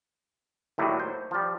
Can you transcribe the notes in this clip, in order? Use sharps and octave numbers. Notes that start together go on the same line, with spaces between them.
D#2 A2 F#3 G3
C5
F3 G3